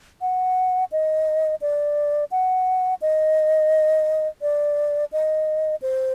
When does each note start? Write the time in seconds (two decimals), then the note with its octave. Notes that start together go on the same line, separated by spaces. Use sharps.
0.21 F#5
0.92 D#5
1.62 D5
2.31 F#5
3.02 D#5
4.42 D5
5.12 D#5
5.82 C5